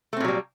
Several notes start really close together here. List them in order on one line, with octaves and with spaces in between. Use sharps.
A3 C4 A#2 F#3 G3